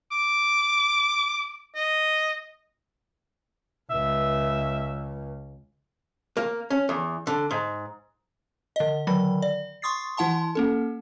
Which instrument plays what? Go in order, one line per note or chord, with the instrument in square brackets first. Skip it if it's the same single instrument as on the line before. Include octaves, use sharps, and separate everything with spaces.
[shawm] D6
D#5
[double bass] C#2 [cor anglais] E5
[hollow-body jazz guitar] A#3
C#4
E2
D3
G#2
[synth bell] D3 D#5
D3 D#3 F#3 B5
D5
C6 C#6 D#6 A6 C7
E3 E4 F#5 A5 C6
A#3 C#4 A4